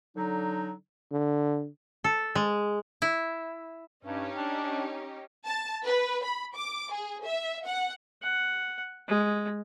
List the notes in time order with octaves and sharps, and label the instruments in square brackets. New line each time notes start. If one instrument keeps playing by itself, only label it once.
[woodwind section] D3 F#3 D#4
[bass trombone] D3
[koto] A4
G#3
E4
[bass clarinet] G2 [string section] C#4 D#4 G4
[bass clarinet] D4
[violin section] A5
B4
B5
D6
G#4
E5
F#5
[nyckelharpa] F#5
G#3